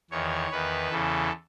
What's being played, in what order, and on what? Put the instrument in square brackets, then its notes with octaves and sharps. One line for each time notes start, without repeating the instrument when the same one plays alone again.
[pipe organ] E2 D#3 C#5
E2 D#3 B4
E2 C#3 E3 A4